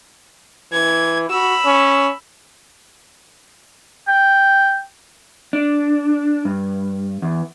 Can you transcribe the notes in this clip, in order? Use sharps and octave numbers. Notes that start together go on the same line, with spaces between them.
E3 G#6
F#4 B5 E6
C#4
G5
D4
G2
E2